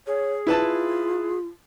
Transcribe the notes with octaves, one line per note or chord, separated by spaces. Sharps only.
G#4 C#5
E4 F4 B4 A5